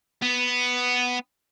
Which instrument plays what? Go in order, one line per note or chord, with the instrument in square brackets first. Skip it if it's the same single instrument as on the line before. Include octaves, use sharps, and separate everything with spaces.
[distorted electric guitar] B3